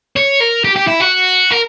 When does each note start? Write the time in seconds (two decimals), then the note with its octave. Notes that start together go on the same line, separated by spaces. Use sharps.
0.16 C#5
0.40 A#4
0.65 G4
0.76 G4
0.88 E4
1.01 F#4
1.51 A#4